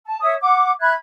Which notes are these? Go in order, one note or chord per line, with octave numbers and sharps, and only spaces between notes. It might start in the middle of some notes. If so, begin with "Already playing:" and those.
A5
C#5 E5 D#6
F#5 D6
E5 B5 F#6 G#6